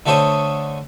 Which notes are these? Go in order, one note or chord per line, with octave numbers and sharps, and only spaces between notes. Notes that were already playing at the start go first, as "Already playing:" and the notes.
D3 A3 A4 C5 C#5 D#6